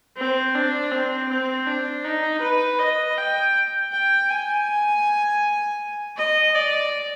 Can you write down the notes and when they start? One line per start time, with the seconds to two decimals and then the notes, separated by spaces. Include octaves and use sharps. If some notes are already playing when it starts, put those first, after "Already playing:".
0.17 C4
0.55 D4
0.91 C4
1.29 C4
1.67 D4
2.05 D#4
2.41 B4
2.79 D#5
3.18 G5
3.93 G5
4.30 G#5
6.17 D#5
6.55 D5